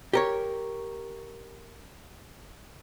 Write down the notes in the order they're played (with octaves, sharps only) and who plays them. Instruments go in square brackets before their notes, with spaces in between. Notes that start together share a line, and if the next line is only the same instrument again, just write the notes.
[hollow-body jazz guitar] G4 A#4 C#5